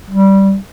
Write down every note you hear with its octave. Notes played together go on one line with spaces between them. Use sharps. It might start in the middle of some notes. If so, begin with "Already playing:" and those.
G3